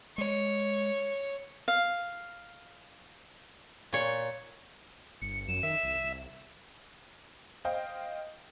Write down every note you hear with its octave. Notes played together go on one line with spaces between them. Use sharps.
G#3 C#5
F5
A#2 C#5
G1 C#7
F#2 E7
D#3 E5
C2
C5 D#5 F5 G5